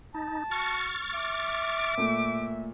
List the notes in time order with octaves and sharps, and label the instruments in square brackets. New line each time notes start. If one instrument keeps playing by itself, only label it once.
[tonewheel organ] D#4 [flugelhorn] A5
[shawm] F#4 [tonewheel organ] C#6 F6 A6
[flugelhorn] E5 [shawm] D6
[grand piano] A#2 A3